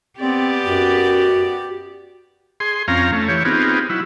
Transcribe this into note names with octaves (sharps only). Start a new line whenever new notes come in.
B3 C4 G4 D5
F#2 F#4
G#4 C6
F2 C4 C#4 F5 A#5
A3 C#4
E3 G4 C#5
B3 C4 D#4 F4 G4 G#4
F#3 E4